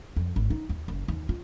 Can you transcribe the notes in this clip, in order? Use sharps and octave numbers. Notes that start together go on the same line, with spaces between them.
F2
G#1
D#4
D#2
F#1
D#2
F4